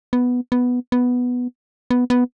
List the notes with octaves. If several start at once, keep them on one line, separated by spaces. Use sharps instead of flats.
B3
B3
B3
B3
B3